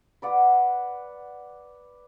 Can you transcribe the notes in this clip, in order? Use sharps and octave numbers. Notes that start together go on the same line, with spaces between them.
B4 D5 F#5